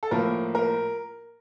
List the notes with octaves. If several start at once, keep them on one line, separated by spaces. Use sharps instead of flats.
A4
A2 F3 A#3 A#4
A#4